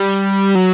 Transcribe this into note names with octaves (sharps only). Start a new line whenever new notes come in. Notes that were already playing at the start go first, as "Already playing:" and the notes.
Already playing: G3
F#3